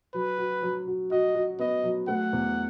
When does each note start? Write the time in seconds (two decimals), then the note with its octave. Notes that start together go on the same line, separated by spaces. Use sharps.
0.14 F#3 B4
0.38 F#4
0.63 F#3
0.88 F#4
1.11 F#4 D#5
1.35 F#4
1.59 B3 D#5
1.84 F#3
2.08 A3 F#5
2.33 E2